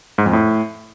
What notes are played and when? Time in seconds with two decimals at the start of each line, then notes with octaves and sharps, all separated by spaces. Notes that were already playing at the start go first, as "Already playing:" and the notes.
0.18 G#2
0.26 F2
0.33 A2